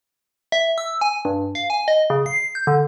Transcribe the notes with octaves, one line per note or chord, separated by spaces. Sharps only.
E5
E6
G#5
G2
F5
G#5
D#5
C#3
C7
G6
D3